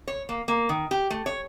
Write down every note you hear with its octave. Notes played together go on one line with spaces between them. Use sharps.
C#5
A#3
A#3
D#3
G4
A3
C#5